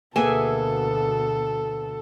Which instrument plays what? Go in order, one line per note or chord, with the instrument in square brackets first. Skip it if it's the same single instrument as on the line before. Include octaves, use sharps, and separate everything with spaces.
[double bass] D2 B2 [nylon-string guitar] A#3 B3 [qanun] G#4 E5 G#5 [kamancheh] A4